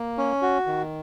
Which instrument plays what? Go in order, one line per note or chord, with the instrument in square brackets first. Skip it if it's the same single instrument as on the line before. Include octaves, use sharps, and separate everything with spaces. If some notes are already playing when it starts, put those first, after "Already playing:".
Already playing: [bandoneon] A#3
C#4
F#4
D#3